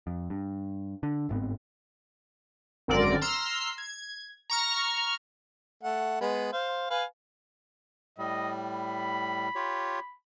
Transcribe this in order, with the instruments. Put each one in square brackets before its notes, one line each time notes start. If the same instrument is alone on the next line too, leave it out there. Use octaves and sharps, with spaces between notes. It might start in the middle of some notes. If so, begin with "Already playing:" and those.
[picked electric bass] F2
G2
D3
G1 G#2 B3 C4
[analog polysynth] G#1 F#2 D3 C4 A#4 D5
A#5 C6 E6 F6 C7
G#6
A#5 C#6 F6
[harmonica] A3 F#5
G#3 B3
C5 F5
B4 F5 G#5
[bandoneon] A2 G3 [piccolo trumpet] D#5
[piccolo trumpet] B5
[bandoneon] F4 G4 C#5